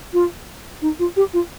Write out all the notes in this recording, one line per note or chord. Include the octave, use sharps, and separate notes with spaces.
F4
D#4
F4
G4
F4